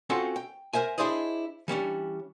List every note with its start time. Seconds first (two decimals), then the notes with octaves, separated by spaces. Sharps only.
0.10 C4 C#4 F4 F#4 A4 C5
0.36 G5
0.73 A#4 C5 E5 G#5
0.98 D4 E4 G#4 C5 D5 D#5
1.68 E3 G3 C#4 D4